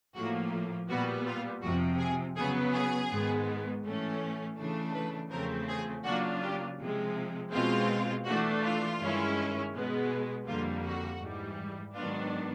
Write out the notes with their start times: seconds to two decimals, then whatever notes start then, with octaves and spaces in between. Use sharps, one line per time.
0.15 A2 F3 A#3 F#4
0.89 A#2 G3 B3 F#4
1.27 F4
1.62 F2 C3 F3 F#4
1.99 G#4
2.36 C#3 F#3 B3 G#4
2.73 G#4
3.10 G#2 D#3 G#3 B3
3.83 A2 E3 A3 C#4
4.58 C#3 E3 A3 D4
4.94 B4
5.31 E2 C#3 F3 A3 C4 A#4
5.69 G#4
6.04 C#3 F#3 A#3 D4 F4 F#4
6.42 G4
6.79 C3 F3 G#3
7.52 B2 G#3 C4 F4
8.26 E3 A3 D4 F#4
8.63 F4
9.00 G2 D#3 G#3 C#4 E4
9.74 B2 G#3 B3
10.47 F2 D3 G3 A#3 F4
10.84 F#4
11.21 G#2 E3 G3
11.95 G#2 D#3 F#3 B3 D4 F4